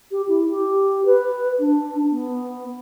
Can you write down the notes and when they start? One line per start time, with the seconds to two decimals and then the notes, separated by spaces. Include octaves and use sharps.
0.11 G4
0.28 E4
0.49 G4
1.06 B4
1.60 D4
2.12 B3